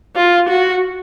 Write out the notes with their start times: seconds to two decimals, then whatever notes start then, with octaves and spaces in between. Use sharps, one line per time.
0.16 F4
0.49 F#4